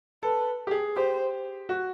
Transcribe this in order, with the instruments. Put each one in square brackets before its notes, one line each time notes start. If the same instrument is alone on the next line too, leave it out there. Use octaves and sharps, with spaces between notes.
[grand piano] A4 [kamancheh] B4
[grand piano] G4
G#4
[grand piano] G4 [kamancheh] C5
[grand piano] F#4